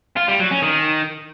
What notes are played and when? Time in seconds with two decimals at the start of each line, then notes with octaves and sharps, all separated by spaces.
0.17 F4
0.28 G3
0.40 F#3
0.51 C#4
0.62 D#3